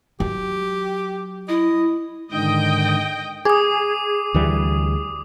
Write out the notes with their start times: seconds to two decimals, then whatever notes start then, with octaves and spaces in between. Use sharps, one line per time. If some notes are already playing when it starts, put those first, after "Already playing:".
0.20 F#3 G4
1.49 E4 D#5
2.32 G#2 D3 D#3 D#5 G5
3.45 G#4 D6 D#6
4.34 D2 E3 G3